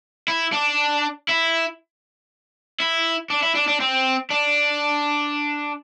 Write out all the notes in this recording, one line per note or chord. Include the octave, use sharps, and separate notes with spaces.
E4
D4
E4
E4
D4
E4
D4
D4
C4
D4